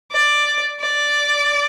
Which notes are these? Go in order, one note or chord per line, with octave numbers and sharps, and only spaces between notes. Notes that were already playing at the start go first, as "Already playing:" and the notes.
D5
D5